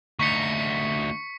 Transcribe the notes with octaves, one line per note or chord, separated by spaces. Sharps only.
D2 D#4 C#6 B6 C#7